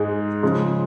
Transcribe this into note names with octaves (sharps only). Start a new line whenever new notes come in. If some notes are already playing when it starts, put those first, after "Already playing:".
Already playing: G#2 G#3 D#4 G#4
C#3 F3 G#3